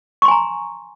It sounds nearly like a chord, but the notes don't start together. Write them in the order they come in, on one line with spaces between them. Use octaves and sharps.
C#6 C6 G#5 A#5